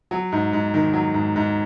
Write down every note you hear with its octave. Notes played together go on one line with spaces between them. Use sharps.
F#3
G#2
G#2
D#3
F#3
G#2
G#2